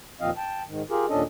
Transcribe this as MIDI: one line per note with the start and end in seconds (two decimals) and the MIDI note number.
0.21 0.30 39
0.21 0.30 46
0.21 0.30 53
0.21 0.30 60
0.21 0.30 75
0.21 0.30 77
0.37 0.63 79
0.37 0.63 81
0.68 0.82 44
0.68 0.82 51
0.90 1.06 65
0.90 1.06 67
0.90 1.06 68
0.90 1.06 70
1.09 1.23 39
1.09 1.23 46
1.09 1.23 61
1.09 1.23 62
1.09 1.23 69
1.09 1.23 75